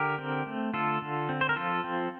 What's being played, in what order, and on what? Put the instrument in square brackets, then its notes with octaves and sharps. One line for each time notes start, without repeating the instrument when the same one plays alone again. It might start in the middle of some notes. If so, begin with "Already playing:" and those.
Already playing: [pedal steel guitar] D3 G4 A#4
C4
A3
D3 F4 A4
D3
C4
C5
A#4
F3 F4 A4
C4